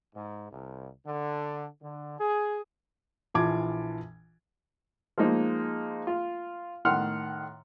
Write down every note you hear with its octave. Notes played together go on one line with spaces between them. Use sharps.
G#2
C2
D3
D3
G#4
A#1 E3 F4 A5 D6 G#6
F3 G#3 A#3 D#4
F4
A2 D#3 F#5 C6 F6